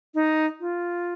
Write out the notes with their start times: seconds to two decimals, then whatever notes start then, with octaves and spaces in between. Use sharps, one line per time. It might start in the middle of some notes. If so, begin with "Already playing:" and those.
0.14 D#4
0.60 F4